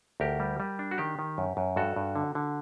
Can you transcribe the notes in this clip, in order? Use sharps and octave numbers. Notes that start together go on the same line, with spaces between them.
D2 G4 A#4
G3
G3
D4
F#4
D#3 G4
D#3
F#2
F#2
G2 F#4 A4
G2
D3
D3